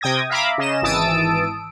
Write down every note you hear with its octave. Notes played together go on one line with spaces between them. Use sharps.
C3 G5 D#6 G#6 A#6
E5 F5 A#5 B5 D6
C#3 D#5 E7
G#1 E3 A5 D#6 E6 D7